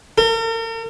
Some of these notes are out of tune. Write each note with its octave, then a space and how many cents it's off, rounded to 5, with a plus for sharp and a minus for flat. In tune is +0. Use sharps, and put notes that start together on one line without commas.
A#4 -45